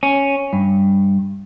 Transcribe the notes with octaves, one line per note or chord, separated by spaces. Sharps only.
C#4
G2